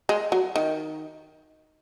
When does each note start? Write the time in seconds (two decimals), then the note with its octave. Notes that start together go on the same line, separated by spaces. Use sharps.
0.09 G#3
0.32 F#3
0.56 D#3